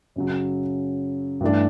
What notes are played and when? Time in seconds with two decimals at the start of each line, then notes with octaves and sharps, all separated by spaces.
0.16 F#2 C#3 F#3
1.41 G2 E3 A3 D4